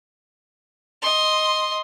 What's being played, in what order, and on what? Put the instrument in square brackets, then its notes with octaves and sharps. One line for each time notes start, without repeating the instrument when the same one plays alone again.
[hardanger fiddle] D#5 C6